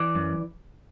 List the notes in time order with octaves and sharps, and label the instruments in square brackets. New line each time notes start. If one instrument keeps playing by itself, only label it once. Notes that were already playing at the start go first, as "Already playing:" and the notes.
Already playing: [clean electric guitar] E3 D5
F#2